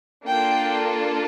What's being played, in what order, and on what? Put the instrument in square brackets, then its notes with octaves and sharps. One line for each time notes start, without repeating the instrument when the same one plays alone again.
[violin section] A#3 D4 F4 A4 G5